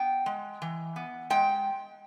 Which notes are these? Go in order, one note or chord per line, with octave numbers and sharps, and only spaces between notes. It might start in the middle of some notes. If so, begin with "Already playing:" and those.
Already playing: B3 G5
G#3
E3
B3
G#3 G5